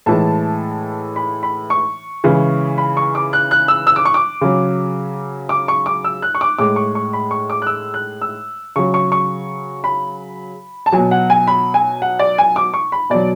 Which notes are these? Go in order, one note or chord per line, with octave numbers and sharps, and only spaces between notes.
A2 E3 G#3 A5
B5
B5
C#6
C#3 E3 G#3
B5
C#6
D6
F#6
F#6
E6
E6
D6
C#6
D6
C#3 F#3
D6
C#6
D6
E6
F#6
C#6
D6
A2 G#3 D6
C#6
C#6
B5
C#6
D6
F#6
E6
F#6
E6
C#3 F#3 C#6
C#6
C#6
B5
A5
B2 F#3 G#5
F#5
G#5
B5
G#5
F#5
D5
G#5
D6
C#6
B5
B2 F#3 D5